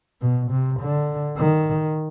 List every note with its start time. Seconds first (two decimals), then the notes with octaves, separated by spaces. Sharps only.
0.21 B2
0.51 C3
0.80 D3
1.37 D#3